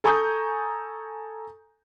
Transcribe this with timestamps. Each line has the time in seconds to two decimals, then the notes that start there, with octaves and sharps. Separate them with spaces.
0.04 A4 G#5 A#5 C#6 D#6 G6